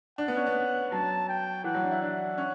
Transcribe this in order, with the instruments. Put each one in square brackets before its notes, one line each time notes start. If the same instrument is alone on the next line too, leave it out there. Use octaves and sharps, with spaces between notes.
[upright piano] D4 [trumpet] F#5
[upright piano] B3
C#4
B3
[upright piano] F#3 [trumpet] A5
[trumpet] G5
[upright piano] E3 [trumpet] F#5
[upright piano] F#3
D4
E4
[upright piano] D4 [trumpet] F#5
[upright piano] C#4